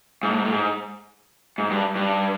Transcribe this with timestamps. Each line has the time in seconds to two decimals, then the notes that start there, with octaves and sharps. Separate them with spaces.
0.23 G#2
0.30 A2
0.37 G#2
0.45 A2
0.52 G#2
1.58 G#2
1.70 G2
1.96 G2